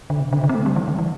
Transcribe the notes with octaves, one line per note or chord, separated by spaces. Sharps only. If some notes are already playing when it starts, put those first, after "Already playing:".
D3
C3
D3
D3
C4
A3
G3
E3
D3
E3